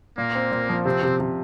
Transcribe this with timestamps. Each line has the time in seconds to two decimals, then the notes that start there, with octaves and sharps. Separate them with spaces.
0.17 A#2 A#3
0.35 C4
0.52 A#2
0.69 F3
0.85 C3 C4
1.03 C3
1.20 C3